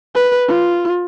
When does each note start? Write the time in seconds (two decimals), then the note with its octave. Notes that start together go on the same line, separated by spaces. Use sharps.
0.15 B4
0.48 F4